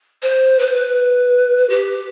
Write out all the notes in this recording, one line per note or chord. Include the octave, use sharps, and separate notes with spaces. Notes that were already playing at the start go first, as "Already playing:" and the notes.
C5
B4
C5
B4
G4